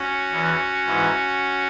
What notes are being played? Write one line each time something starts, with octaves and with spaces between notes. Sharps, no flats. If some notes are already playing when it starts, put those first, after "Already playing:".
Already playing: C#4 F#4
E2 E3
G#2 E3